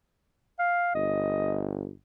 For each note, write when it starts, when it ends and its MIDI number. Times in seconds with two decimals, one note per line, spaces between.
0.59 0.91 77
0.95 1.90 31
0.95 1.67 75